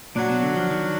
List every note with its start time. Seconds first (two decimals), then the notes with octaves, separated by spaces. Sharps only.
0.16 A#2 F#3 D4 F#4
0.29 B2
0.43 D3
0.57 F3
0.70 D#3